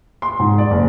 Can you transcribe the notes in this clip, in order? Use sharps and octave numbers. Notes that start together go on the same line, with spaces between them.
C6
G#2
D5
F#1